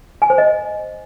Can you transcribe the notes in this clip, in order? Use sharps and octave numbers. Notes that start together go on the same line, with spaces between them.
G#5
C5
D#5